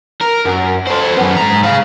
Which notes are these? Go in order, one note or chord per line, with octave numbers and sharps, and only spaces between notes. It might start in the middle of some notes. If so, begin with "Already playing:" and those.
A#4
F#2
A4 C5
F#2 B3
G#2 A#5
G#4 F5